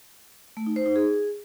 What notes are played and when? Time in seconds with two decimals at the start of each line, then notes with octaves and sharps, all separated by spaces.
0.57 A3
0.66 D#4
0.76 C5
0.86 D#4
0.96 G#4